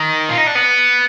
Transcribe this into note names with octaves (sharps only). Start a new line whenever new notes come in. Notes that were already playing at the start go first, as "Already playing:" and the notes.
Already playing: D#3
F4
D#4
D4
B3